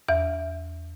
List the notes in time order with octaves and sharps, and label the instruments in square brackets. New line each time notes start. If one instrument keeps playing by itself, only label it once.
[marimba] E2 E5